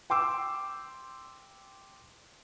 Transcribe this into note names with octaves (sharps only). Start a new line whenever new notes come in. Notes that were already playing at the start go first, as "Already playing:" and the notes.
G5 C6 D6 E6